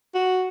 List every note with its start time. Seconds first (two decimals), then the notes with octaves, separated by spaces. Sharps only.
0.14 F#4